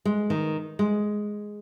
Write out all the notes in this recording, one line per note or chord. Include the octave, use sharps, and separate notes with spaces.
G#3
D#3
G#3